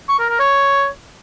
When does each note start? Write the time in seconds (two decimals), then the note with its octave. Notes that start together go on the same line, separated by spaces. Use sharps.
0.09 C#6
0.19 A#4
0.29 A#4
0.39 C#5